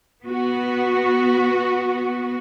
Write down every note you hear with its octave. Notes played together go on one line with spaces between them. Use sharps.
B3 F#4